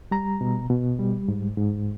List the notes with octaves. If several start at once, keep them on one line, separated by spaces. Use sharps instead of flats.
G3 A#5
B2
B2
G3
G#2
G#2